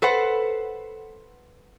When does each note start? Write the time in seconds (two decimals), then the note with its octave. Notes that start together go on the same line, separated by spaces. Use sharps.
0.02 A4 B4 C5 F#5